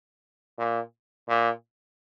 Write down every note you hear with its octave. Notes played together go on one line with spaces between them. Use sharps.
A#2
A#2